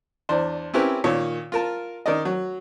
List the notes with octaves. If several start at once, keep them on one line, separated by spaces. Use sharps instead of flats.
E2 D4 C5
C4 C#4 E4 G4 A#4 B4
A#2 D#3 C#5
F4 A#4 A5
D#3 A#4 D5 D#5
F#3